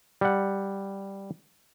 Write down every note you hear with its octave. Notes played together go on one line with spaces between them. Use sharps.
G3 F#5